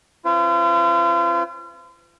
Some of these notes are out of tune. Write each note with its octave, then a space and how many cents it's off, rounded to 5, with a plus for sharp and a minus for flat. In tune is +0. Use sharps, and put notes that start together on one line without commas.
C4 +35 F4 -40 B4 +45